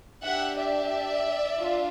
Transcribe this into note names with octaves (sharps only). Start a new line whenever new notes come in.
D4 G4 E5 F#5
D5 E5
D4 F4